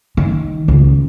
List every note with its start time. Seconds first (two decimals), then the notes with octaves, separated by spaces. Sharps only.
0.17 D#3
0.68 C#2